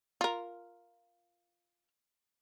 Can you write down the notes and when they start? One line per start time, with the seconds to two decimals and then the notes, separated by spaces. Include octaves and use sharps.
0.21 F4 A#4